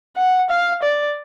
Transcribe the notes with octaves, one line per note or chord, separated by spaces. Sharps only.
F#5
F5
D5